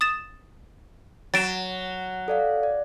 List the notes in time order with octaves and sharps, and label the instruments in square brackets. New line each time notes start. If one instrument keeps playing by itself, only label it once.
[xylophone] D#6 A6 E7
[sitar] F#3 [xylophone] A6 D7 E7
[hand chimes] A4 D5 F5
D5